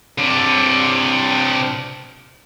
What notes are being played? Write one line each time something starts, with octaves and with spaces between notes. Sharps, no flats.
C3 D4